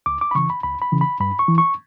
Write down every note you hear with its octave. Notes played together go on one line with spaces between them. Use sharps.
C#2 D6
D6
B5
C#3 E3 C#6
B5
C#2 B5
B5
C#3 E3
B5
G2 B5
C#6
E3
C#6